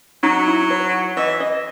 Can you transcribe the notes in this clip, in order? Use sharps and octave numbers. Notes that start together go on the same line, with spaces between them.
F#3 D#4
E4
C#5
E3 D#5
D#5